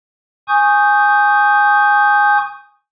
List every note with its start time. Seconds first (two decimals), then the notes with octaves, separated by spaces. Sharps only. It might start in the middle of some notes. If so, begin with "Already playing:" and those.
0.48 G#5 C#6 D#6 G6